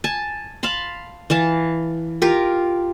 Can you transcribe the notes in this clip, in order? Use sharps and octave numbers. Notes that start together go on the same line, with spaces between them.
G#5 A5
F5 A5 B5 C6
E3 F5 A5
F4 G4 A#4